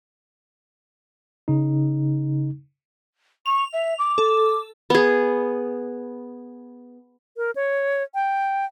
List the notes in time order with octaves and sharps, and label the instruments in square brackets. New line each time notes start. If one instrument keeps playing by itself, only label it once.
[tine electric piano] C#3 D#4
[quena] C#6 [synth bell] F7
[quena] E5
D6
[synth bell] A4
[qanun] B3 G#4
[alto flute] A#4
C#5
G5